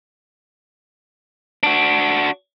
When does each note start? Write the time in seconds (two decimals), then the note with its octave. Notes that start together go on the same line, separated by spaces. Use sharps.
1.63 D4 F#4